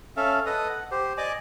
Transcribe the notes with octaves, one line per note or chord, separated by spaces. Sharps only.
C#4 A4 E5 F5
A4 B4 D#5 D#6
F#5
G4 C5
D5 D#5 G#5 D6